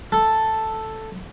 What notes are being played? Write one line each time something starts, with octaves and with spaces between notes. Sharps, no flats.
A4